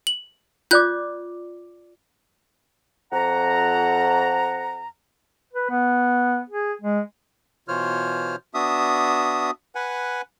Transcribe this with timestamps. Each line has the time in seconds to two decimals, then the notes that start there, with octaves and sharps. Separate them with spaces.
0.07 F#7
0.71 F4 D5 D6 F#6 G6
3.13 F2 F#5 A#5
5.53 B4
5.70 B3
6.50 G#4
6.81 G#3
7.68 B2 E3 F4 C5 C#5 F6
8.54 B3 D4 F#4 E5 D#6
9.75 B4 F#5 G#5